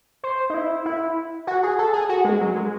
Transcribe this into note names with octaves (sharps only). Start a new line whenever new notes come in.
C5
D#4
E4
E4
F#4
G#4
A4
G#4
F#4
G#3
F#3
G#3